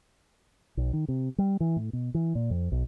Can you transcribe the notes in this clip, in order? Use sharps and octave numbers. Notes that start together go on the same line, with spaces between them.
B1
D#3
C3
G3
E3
A2
B2
E3
A#2
F2
B1